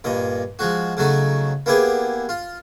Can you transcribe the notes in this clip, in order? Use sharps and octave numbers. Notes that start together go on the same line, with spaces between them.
G2 A#2 D#5
F3 G#3 F#4
C#3 F#3 A3 D#4
A#3 B3 E4 G4 G#4
F4